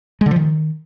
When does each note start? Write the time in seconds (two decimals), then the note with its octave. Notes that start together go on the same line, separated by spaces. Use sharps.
0.21 G#3
0.26 D3
0.31 F3
0.36 D#3